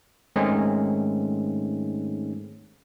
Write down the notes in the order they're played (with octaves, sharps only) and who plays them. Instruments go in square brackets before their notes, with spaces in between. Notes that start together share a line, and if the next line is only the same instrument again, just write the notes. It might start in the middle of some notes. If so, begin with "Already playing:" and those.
[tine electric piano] G#2 D#3 G#3 A3 C4 C#4